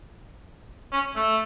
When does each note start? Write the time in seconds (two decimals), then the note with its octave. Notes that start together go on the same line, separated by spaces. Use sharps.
0.92 C#4
1.15 A3